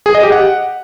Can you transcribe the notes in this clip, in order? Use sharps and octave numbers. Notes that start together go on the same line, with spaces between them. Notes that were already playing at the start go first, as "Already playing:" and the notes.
G#4
D#5
G4
F#5